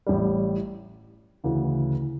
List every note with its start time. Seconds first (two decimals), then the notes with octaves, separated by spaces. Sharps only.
0.07 A1 A2 G3
1.44 D2 C#3 E3